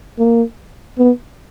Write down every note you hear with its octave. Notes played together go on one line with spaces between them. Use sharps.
A#3
B3